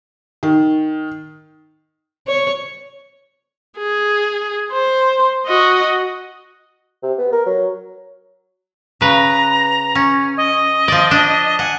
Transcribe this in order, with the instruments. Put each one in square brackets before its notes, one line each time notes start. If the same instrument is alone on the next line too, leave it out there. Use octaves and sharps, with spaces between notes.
[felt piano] D#3
[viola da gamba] C#5
[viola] G#4
C5
F#4 D#5
[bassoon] C3
B3
A#4
F#3
[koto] C#3 B4 [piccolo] A#5
[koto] C#4
[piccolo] D#5
[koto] F3 D5
D4
[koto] F#5 [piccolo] G#5